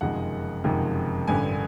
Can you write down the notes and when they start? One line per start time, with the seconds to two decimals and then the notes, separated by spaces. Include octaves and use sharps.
0.01 F#1 F2 C3 D#3 G#3 F#5
0.64 F#1 F2 C3 D#3 G#3
1.28 A1 G2 D3 G#5